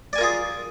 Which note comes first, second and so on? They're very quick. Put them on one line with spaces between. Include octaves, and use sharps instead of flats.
D5 G#5 A#4 F4 G#4